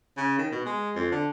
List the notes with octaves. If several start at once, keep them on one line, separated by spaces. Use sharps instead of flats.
C#3
D#3
B2
G#3
F2
D3